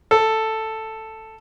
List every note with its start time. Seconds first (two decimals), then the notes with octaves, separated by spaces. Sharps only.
0.11 A4